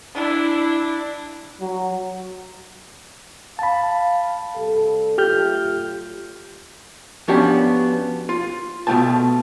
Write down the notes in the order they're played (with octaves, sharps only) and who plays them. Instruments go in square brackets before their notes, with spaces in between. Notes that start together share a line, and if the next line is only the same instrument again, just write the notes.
[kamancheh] D4 E4
[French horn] F#3
[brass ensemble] F5 [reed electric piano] A5 B5
[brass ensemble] C3 G3 A4
[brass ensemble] F#3 A3 F4 [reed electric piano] G4 F6 G6
[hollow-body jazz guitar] F3 B3 C#4 D4 F#4 G4
F4
B2 A3 D4 F4 G5 A5